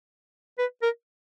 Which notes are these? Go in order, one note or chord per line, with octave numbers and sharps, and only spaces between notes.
B4
A#4